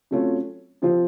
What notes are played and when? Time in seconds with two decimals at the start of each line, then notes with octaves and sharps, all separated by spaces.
0.11 C3 F#3 A3 C#4 F4
0.82 C3 F3 C4 F4